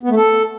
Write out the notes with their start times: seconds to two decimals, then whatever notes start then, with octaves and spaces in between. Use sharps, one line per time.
0.03 B3
0.10 A3
0.16 A4